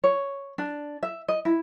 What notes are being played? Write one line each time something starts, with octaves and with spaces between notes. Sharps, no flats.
C#5
D4
E5
D#5
E4